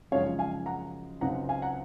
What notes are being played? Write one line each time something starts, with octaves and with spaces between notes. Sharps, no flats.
F#2 C#3 F3 G#3 D#4 C#5 F5
F5 G#5
F#5 A#5
C#2 C#3 F#3 C4 D#4 F#5 A#5
F5 G#5
F#5 A#5